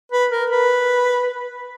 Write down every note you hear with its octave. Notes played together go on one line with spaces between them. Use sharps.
B4
A#4
B4